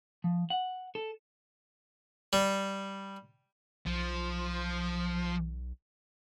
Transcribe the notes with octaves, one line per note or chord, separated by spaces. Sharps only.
F3
F#5
A4
G3
B1 F3